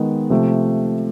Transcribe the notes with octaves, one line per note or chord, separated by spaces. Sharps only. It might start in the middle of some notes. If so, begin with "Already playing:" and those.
Already playing: D#3 G#3 B3
C3 F3 A3